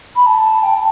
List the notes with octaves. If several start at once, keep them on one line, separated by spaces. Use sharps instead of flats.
B5
A5
G5
A5